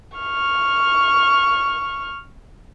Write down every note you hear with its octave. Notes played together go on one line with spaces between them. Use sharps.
C#6 F6